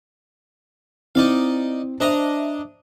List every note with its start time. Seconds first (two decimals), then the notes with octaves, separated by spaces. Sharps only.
1.15 C4 D#4 E4 D5 F5
2.00 D4 C5 D#5 E5 A#5